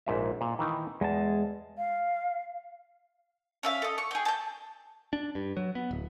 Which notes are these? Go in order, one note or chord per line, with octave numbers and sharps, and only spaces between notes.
A#1 G#2 E5
A#2
D#3 E3 D#4
E2 G#3 A5
F5
C#4 E5 F5
A4 D#5
C#6
G#4 G5
A5 G6
D4
G2
F#3
B3
D1